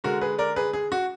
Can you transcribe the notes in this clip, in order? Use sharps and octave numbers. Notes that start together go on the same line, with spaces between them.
D3 G#3 F#4 A#4
G#4 B4
A#4 D5
G#4 B4
G#4
F#4